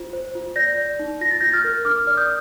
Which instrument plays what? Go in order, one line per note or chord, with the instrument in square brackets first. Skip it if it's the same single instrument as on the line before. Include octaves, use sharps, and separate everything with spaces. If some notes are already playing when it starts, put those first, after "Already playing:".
Already playing: [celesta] F4 C5
C5
F4
D5 G6 A#6
D5
D#4
F4 A#6
A6
F4 G6 A#6
F6 A6
A#4
D4 D6 F6
D5 F6
D#6 G6